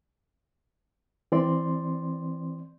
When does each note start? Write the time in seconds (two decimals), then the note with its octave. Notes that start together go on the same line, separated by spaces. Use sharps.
1.32 E3 C4 D5 C6